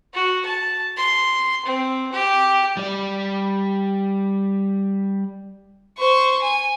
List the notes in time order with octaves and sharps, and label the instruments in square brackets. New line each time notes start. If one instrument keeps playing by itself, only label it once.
[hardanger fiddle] F#4
A5
C6
C4
G4
[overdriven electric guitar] G3 D5
[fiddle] C5 C#6
G#5